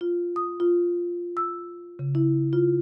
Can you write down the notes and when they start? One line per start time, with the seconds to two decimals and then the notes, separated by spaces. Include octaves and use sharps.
0.01 F4
0.36 D#6
0.60 F4
1.37 E6
1.99 C#3
2.15 E4
2.53 F4